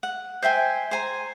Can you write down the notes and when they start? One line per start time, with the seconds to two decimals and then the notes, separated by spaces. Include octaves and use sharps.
0.03 F#5
0.43 C5 E5 G5 G#5
0.91 C5 G#5 A#5